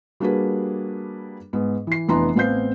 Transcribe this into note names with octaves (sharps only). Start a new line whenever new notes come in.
G3 A#3 D4 F#4 G#4 B4
G#2 B3
E3 C7
F1 E3 B3 D4 A#5 C6
A1 B3 C4 F5 G6 C7